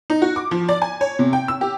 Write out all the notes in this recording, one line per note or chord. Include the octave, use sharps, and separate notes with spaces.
D#4
F#4
D6
F3
D5
G#5
C#5
C3
G5
E6
G4